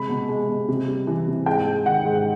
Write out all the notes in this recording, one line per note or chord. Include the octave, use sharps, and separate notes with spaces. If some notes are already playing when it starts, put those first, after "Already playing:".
Already playing: C3 G#3 B5
B2
G#3
B2
C3
G3
E3
C3
G#2 G5
G#3
D#3 F#5
G#2